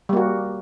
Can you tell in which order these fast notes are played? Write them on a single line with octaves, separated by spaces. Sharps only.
G3 A#3 F#4